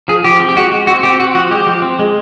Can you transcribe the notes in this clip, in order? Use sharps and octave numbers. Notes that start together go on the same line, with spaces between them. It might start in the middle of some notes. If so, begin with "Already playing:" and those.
F3 G#4
F3 G4
C4
G4
G#3 F#4
G#3
C4 F#4
C4 G4
C4 F#4
F3 F#4
G#3 G4
F3
C4
G#3